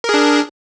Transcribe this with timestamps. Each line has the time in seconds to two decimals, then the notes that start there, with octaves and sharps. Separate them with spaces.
0.04 A#4
0.09 G#4
0.14 D4